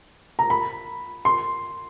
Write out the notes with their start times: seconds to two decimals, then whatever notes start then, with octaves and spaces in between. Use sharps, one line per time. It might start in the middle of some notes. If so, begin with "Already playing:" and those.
0.39 A#5
0.50 B5
1.25 C6